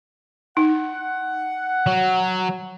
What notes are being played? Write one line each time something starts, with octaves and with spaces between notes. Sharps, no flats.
D#4 F#5
F#3